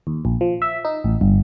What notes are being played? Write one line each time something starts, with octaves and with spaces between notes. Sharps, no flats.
D#2
A#1
F3
E5
D#4
A1
G1